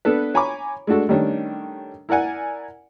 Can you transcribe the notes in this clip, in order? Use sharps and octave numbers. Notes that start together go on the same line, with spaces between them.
B3 D4 A4 B4
C#5 G#5 A#5 B5 C#6 D6
G#3 A3 D4 F#4 A4
D#3 G3 A3 C#4 D4
E4 A#4 D5 F#5 G#5